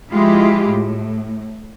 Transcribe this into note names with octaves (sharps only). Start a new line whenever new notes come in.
F3 G#3 E4 F4 G4
A2